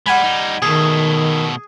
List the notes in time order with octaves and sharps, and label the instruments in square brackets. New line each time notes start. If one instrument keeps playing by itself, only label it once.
[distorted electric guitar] G3 G#3 [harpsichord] F#5 G#5 B5
[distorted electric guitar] G3 D#4
[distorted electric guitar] B2 A3 [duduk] D#3 [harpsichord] G#4